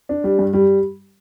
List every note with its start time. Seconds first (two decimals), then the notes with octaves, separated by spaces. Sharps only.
0.09 D4
0.24 G3
0.39 G2
0.53 G3